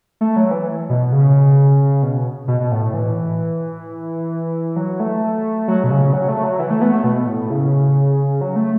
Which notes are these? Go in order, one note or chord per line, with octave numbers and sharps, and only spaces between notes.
A3
F#3
E3
B2
C#3
B2
B2
B2
A2
E3
F#3
A3
F#3
B2
C#3
F#3
A3
F#3
E3
A3
B3
A3
B2
A2
C#3
F#3
A3